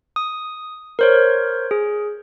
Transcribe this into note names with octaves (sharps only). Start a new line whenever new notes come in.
D#6
A#4 C5 C#5
G#4